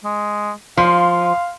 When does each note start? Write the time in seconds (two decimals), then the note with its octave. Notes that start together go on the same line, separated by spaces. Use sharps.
0.04 G#3
0.77 F3 F5 C6